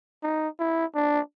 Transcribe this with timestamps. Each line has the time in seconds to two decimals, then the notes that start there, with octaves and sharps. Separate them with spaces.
0.23 D#4
0.60 E4
0.95 D4